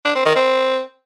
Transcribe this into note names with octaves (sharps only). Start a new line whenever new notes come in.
D4
C4
D#3
C4